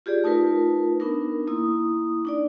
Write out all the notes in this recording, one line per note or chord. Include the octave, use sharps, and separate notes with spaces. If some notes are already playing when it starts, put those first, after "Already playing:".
F4 G4 G#4 D5
A3 D#4 F4 A#4 B4
B3 D4 D#4 A#4
A#3 E4 D#6
D4 D#4 D5